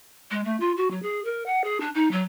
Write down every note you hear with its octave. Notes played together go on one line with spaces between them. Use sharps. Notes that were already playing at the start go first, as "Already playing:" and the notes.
G#3
A3
F4
F#4
F#3
G#4
A#4
F#5
G#4
D4
D#4
F#3